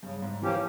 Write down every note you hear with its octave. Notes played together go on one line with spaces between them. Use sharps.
G2 C#3
G#2
E3 F3 A#3 C#4 G4